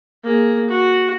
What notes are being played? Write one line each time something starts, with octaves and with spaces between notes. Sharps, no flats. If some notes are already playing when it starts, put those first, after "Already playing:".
A#3 G#4
F#4